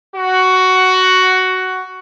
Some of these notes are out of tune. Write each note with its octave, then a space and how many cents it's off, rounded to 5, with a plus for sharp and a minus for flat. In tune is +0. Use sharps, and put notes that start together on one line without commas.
F#4 +10